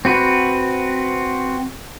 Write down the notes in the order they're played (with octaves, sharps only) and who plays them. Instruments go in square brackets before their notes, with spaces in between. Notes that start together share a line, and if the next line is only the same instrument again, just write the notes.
[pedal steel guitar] C4 F#4 B4